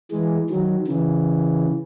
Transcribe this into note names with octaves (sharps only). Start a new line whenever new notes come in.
E3 G#3
D#3 F#3
C#3 E3